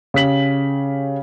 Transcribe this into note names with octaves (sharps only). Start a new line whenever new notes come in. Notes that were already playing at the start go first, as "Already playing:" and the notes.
C#3 G4 B6 F#7